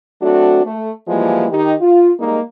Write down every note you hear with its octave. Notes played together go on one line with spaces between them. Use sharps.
F#3 A3 C4 D4 F#4
A3
E3 F3 G3 G#3 A#3 E4
D#3 D#4 G4
F4
G3 G#3 A#3 D#4